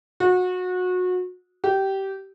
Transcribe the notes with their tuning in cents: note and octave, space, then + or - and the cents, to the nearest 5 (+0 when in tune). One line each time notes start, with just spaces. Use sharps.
F#4 -25
G4 -20